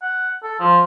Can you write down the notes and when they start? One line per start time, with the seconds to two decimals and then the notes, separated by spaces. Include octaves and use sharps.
0.02 F#5
0.43 A4
0.59 F3